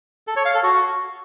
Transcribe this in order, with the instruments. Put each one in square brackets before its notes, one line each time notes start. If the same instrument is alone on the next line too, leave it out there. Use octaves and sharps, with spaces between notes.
[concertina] A4
C#5
F5
A4
F#4